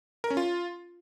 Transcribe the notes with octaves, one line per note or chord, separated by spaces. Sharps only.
A#4
C#4
F4